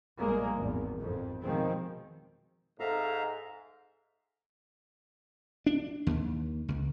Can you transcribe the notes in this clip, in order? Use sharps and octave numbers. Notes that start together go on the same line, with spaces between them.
A#1 A#2 G3 G#3 A#3
G#1 E2
F2 G#2
B2 D#3 F3 G#3 C4
G#2 A4 E5 F5 A#5
D4
D#2
C#2